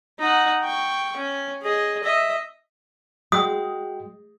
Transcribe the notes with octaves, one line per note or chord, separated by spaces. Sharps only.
D#4 F#5
G5 C#6
C#4
G#4 D#5
D#5 E5
G#3 F#4 G5 D#6